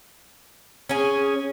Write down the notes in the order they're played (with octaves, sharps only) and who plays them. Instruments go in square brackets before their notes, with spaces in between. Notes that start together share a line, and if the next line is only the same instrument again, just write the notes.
[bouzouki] C#4 G#4